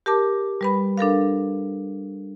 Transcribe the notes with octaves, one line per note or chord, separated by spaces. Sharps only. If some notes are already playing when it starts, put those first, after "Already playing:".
G4 A#4 A5 D6
G3 B4 B5
D4 A4 A#4 F5